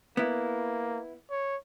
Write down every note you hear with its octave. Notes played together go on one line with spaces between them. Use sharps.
A#3 B3 E4
C#5